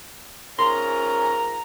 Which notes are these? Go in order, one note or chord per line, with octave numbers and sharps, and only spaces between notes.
G#2 C#4 F4 A#4 A#5 C6